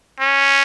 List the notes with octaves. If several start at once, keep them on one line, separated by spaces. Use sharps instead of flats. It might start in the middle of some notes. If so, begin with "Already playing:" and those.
C#4